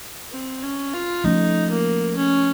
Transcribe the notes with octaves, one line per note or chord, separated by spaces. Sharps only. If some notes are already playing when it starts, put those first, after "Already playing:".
C4
C#4
F4
F3 A3 C#4 D#4
A#3
C#4